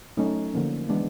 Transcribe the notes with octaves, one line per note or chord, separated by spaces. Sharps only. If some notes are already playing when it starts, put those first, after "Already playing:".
F#3 A3 C#4 D#4
D3 F3 A#3 C#4
E3 G#3 B3 D4